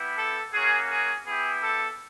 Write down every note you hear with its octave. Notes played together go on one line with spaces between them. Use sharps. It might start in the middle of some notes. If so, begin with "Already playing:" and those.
Already playing: B3 E4 G4
A4
A#3 C#4 F#4 G#4
G#4
B3 E4 G4 G#4
A4